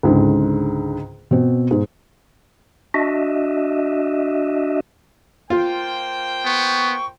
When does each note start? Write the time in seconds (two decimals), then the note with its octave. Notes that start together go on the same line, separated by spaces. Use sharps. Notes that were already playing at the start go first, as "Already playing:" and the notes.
0.03 C#2 G#2 D3
1.31 B2 C4
1.71 G#2
2.94 D4 F#4 D#5 E5
5.50 A#3 F4 C5 G5
6.45 B3 C#6